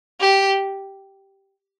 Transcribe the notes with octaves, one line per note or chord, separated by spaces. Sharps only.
G4